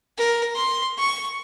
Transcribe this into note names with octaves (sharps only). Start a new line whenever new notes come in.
A#4
C6
C#6